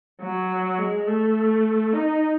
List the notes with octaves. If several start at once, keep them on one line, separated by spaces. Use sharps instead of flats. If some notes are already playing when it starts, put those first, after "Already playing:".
F#3
G#3
A3
D#4